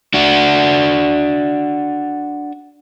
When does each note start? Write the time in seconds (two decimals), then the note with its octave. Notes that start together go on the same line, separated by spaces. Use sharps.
0.14 D4 F#4